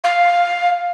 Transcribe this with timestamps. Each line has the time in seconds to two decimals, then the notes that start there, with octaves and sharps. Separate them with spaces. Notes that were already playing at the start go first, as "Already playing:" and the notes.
0.04 F5